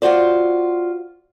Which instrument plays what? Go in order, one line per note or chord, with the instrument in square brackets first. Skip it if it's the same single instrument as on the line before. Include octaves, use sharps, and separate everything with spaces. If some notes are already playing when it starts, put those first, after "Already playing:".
[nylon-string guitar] F4 F#4 C5 D5